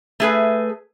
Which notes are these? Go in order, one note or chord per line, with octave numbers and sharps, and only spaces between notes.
A3 G#4 B4